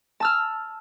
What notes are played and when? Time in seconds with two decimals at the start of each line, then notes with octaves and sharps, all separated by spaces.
0.20 A5 E6 F6